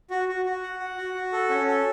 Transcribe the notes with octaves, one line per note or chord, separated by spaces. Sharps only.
F#4
F#4
F#4
F#5
F#5
F#4
F#4
A4
C#4
A4